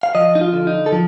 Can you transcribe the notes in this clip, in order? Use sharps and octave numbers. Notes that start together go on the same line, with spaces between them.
F5
F3 D#5
D#4
F4
D3
D#4
A4
F3